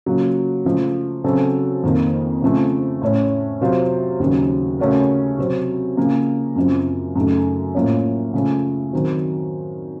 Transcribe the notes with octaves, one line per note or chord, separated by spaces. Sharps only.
C#3 F#3 A#3 F4
C#3 F3 A3
C#3 F#3 C4 F#4 A4
F2 D#3 A#3
C#3 F3 A3 C4
A2 A3 C#4
C3 F#3 C4 F4 C5
D#2 C#3 F#3
C#3 A3 C#4 F#4 A#4
C3 F#3 C4
C#3 F3 A#3
F#2 C#3 F3 C4
F#2 C#3 A3 D#4 A4
A2 F3 A#3 C#4
C#3 F3 A3
D#3 F#3 C4